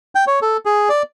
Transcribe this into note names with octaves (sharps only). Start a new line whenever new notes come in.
G5
C#5
A4
G#4
D5